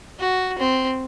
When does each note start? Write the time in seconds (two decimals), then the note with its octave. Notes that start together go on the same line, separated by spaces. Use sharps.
0.19 F#4
0.58 C4